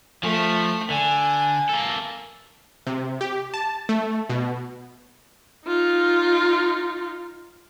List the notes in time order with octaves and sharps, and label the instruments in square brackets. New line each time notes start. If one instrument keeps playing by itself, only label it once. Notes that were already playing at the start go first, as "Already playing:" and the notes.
[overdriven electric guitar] F3 [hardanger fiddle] A3
[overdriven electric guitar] D3 [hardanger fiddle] G#5
[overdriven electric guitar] A#3 A4
[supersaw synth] C3
G4
A5
A3
B2
[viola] D#4 F4